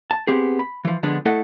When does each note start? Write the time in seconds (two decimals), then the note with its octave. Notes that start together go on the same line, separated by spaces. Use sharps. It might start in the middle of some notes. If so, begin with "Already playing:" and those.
0.11 A5
0.27 B3 C4 G4 G#4
0.59 B5
0.85 E3 F3
1.03 D3 F3 G#3 B3 D4
1.25 A3 E4 A4 D#5 F#5